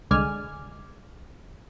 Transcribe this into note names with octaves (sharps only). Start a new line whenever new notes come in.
C2 D3 G#3 D5 G#5 F6